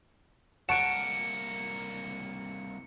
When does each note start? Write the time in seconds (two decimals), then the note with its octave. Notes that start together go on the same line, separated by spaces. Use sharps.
0.69 C2 A#3 F#5 A5 C#6 C#7 D7 E7